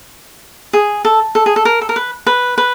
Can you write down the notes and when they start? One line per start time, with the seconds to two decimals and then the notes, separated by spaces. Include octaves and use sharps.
0.73 G#4
1.05 A4
1.35 A4
1.46 G#4
1.56 A4
1.65 A#4
1.81 A4
1.89 A#4
1.96 B4
2.26 B4
2.58 B4